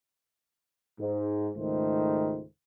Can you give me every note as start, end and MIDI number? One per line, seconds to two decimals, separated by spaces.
1.00 1.49 44
1.55 2.43 37
1.55 2.43 44
1.55 2.43 51
1.55 2.43 57
1.55 2.43 72